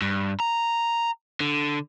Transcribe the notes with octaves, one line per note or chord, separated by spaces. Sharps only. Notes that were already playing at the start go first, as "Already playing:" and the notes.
G2
A#5
D3